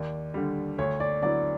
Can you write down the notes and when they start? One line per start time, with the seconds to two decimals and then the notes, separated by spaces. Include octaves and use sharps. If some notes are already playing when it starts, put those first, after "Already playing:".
Already playing: D#2 D5
0.34 D3 G3
0.78 D2 C#5
1.00 D5
1.22 D3 F#3 B3 E4 D5